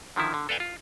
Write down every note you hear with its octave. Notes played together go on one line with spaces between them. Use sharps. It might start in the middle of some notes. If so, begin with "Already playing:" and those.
D3 D#3 F3 E4
D3
A4 B4 D5 F5 G5 G#5
F4